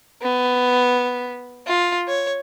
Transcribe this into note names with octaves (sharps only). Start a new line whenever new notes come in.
B3
F4
C#5